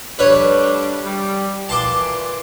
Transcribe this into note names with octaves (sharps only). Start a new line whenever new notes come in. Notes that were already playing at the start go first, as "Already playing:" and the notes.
G3 A3 D4 B4 C#5
G3
A#2 E3 A5 C6 D6